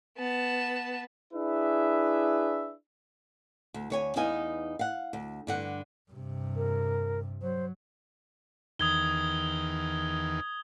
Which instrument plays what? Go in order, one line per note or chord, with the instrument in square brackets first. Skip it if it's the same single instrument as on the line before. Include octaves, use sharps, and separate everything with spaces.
[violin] B3 A5
[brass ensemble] D4 E4 G#4 B4 E5
[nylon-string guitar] D2
D2 C#5 G#5
E2 B3 D#4 F5 G#5
F5 F#5
D2
G2 D3 F#5
[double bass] G2 C3
[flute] A#4
[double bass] F#3 [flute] C5
[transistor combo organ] E2 D#3 [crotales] D#6 G#6 G7